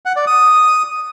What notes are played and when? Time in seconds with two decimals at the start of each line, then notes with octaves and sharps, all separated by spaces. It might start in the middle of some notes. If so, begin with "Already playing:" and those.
0.05 F#5
0.16 D5
0.27 D#6